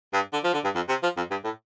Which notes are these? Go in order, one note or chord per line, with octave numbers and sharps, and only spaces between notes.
G2
D3
F3
D3
G2
F2
C3
F3
F2
G2
A2